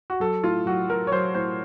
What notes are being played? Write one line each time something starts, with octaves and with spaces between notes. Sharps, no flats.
F#4
F#3 A4
A2 F4
F#3 F#4
F#3 A#4
C#5
F#3 C5
A2 C5